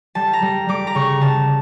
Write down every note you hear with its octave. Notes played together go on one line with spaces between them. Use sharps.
G3 A5
A#5
G3
G3 D6
A#5
C#3 C#6
C#3 A5